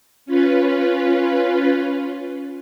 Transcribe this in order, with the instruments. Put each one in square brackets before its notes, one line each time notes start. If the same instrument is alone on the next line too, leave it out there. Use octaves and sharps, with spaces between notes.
[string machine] C#4 F4 B4